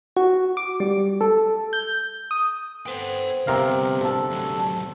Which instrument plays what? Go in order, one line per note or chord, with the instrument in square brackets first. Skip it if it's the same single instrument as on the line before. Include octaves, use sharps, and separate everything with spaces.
[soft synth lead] F#4
D6
G3
A4
G6
D#6
[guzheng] B3 C4 [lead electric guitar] A4 G5
[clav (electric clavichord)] C3 A#4 F5 [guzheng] F3 [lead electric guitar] G3 B3
[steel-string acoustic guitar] D3 A4
[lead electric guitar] D#2 F#3